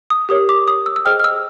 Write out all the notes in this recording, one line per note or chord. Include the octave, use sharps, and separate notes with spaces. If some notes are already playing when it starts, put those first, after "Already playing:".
D#6
G4 A#4 C#5 D#6
D6
D#6
E6
E6
G#4 C5 D#5 G5 F6
F6
E6